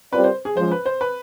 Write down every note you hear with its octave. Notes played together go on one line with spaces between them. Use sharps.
G3 C4 F4 A#4 B4 D5
C5
G#4
F3 G#3 C#4 C5
B4
C5
B4